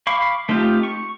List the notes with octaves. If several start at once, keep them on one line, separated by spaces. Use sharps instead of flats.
F5 B5 C#6 D6
A3 C4 D#4 F4 G4
C#6